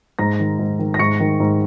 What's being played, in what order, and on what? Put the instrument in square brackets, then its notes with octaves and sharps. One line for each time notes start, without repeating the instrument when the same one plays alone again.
[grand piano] G#2 A#5 A#6
D#3
G#2
D#3
A#6
G#2 C#6 C#7
D#3
G#2